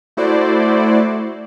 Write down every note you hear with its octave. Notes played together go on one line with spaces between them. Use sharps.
A3 E4 F#4 C5 D5